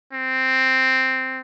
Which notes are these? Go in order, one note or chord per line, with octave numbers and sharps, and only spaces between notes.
C4